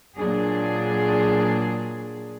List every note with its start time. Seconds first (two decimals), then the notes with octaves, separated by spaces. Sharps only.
0.17 A#2 F#3 D4 G#4